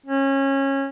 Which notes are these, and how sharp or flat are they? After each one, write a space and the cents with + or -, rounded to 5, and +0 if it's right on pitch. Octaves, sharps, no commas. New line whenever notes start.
C#4 -25